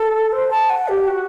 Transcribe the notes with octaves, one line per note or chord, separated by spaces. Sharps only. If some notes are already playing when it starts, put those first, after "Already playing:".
Already playing: A4
C5
A5
F#5
G4
F#4